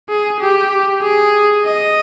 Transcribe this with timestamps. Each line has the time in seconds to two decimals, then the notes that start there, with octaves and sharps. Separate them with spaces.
0.09 G#4
0.40 G4
1.02 G#4
1.65 D#5